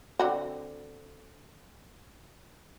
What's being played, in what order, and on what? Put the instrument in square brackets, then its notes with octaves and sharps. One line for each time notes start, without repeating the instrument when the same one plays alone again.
[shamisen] D3 C4 F#4